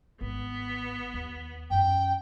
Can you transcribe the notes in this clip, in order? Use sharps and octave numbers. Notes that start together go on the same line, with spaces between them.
G#1 B3
D#2
F#2 C#4 G5